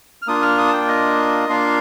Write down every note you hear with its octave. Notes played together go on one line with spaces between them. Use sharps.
F6
A#3 D4 F4 D#6
F6
D#6
A5
G5
D#5
A#3 D4 F4 F5